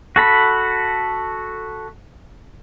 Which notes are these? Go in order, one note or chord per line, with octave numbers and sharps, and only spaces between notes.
F#4 A4 B5